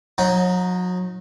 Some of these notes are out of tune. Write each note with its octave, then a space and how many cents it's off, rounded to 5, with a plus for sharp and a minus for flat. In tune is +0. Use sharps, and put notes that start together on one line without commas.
F#3 -35 D#4 +0